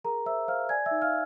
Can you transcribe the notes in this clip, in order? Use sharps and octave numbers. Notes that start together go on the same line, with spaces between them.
G#4 A#4 A#5
C5 E5 E6
C5 F5 F6
D5 G#5 G#6
E5 E6
D#4
F5 F6